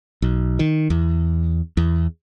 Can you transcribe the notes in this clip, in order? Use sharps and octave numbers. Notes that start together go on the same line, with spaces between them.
B1
D#3
E2
E2